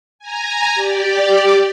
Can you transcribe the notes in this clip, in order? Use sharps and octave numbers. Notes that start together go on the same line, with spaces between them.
G#5 A#5
G4 D5